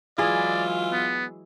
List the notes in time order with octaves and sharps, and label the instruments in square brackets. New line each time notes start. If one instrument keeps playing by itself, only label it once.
[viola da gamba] E3 F#3 G#3 [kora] E4 G#4 [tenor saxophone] F4 [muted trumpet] D5
[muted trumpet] B3